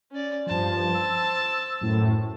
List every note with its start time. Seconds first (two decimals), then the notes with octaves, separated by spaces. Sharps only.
0.11 C#4 D5
0.47 G2 F3 C5 A5
0.94 E6
1.81 F#2 A2